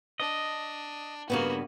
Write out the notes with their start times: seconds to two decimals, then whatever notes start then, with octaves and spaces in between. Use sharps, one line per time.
0.20 D4 D#5
1.30 G2 C#3 A#3 B3 F#4